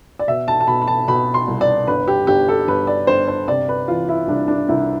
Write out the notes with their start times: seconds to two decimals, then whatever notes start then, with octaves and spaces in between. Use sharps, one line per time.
0.19 D5
0.28 B2 E5
0.48 A5
0.60 A5
0.67 B2 B5
0.82 B5
0.88 A5
1.08 B2 B5
1.34 C6
1.48 C2
1.61 D5
1.88 G1 B4
2.08 G4
2.27 G1 G4
2.48 A4
2.68 G1 B4
2.87 D5
3.07 G1 C5
3.28 C5
3.48 C3 D5
3.69 B4
3.88 E3 F4
4.09 E4
4.28 C2 D4
4.48 D4
4.69 C2 E4